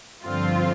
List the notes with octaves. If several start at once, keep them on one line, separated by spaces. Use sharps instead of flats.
G2 D3 F3 C4 F4